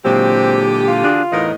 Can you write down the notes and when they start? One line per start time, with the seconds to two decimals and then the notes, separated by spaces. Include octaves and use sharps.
0.05 A#2 D3 E3 F#3 G#3 C4 G4
0.88 F4
1.04 D4 F#4 G#4
1.32 E2 A2 B3 D#4 A#4 D#5